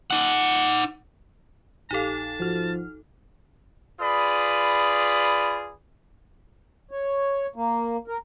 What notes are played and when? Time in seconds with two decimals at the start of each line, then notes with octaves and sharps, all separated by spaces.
0.11 D#4 F#5
1.91 A#1 D#4 G4 A4 F5 A5
2.40 G#1 F3 F#4 F6
4.01 F4 G#4 B4 D5 B5 D#6
6.91 C#5
7.56 A#3
8.08 A#4